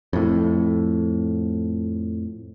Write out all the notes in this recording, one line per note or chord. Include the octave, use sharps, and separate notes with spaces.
F2 A2